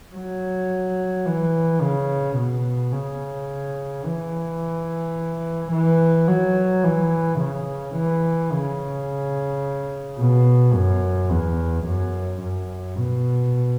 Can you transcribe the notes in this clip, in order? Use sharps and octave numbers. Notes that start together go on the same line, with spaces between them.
F#3
E3
C#3
B2
C#3
E3
E3
F#3
E3
C#3
E3
C#3
B2
F#2
E2
F#2
F#2
B2